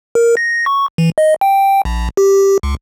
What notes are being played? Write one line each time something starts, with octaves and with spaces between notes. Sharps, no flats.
A#4
A#6
C#6
E3
D#5
G5
A#1
G4
G4
C#2